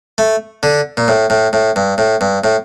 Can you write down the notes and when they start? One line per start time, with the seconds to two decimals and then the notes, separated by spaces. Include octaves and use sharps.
0.18 A3
0.63 D3
0.97 A#2
1.08 A2
1.30 A2
1.53 A2
1.76 G2
1.98 A2
2.21 G2
2.44 A2